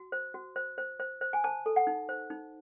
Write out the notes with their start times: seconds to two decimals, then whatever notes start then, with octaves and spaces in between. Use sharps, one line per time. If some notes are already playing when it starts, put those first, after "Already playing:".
Already playing: F#4
0.12 C5
0.34 F#4
0.56 C5
0.78 C5
1.00 C5
1.21 C5
1.33 G#5
1.44 C5 A5
1.66 A4
1.76 F#5
1.87 D#4
2.09 C5
2.30 D#4